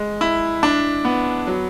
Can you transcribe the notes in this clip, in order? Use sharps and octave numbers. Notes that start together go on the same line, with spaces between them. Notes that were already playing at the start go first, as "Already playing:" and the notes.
Already playing: G#3
E4
D4
B3
F#3